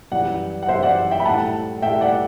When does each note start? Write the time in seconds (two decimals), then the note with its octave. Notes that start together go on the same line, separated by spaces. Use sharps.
0.12 F#2 E3 G3 D5 F#5
0.63 F#5
0.69 F#2 E3 G3 C5 E5
0.83 D5 F#5
1.11 E5 G5
1.20 B5
1.25 A2 G3 F#5 A5
1.82 A2 E5 G5
1.86 G3
2.01 D5 F#5